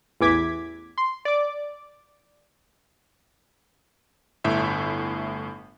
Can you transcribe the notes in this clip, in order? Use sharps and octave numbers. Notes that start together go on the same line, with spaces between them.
A1 E2 E3 D6 G#6 B6
C6
D5 D6
G1 A2 E5 E6